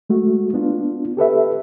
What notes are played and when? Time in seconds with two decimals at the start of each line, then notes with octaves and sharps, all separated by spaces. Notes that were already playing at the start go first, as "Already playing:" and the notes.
0.10 G#3 A3 F#4
0.54 B3 D4 F4
1.17 G4 A4 B4 E5